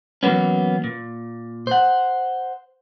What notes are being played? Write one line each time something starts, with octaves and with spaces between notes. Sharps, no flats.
E3 F#3 A#3 B3 C#4
A#2
C5 F#5